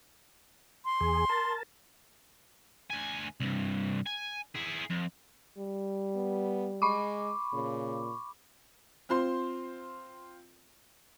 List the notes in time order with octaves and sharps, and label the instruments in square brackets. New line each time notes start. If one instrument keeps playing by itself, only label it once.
[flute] C6
[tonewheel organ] E2 G#4
A#4 A5
[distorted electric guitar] D2 G#5
C2 G2
G#5
E4 G#4
F2
[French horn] G3
[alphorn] B3
[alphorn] G#3 [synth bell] B5 C#6 D6
[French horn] A#2 [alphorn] C#3
[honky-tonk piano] C4 F4 C5 C6